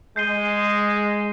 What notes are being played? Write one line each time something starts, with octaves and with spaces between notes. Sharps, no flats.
G#3 G6 C7 D#7 G7